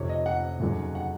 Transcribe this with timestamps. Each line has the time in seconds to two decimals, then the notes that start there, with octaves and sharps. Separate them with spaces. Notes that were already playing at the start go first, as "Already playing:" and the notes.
Already playing: F1 F2 C3 C#5
0.09 D#5
0.26 F#5
0.60 F1 D#2 C#3 F#3
0.95 F#5